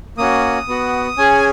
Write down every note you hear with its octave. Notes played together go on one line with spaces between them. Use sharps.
A#3 C#4 F#4 D#6
B3 F#4
C#4 G#4 G#5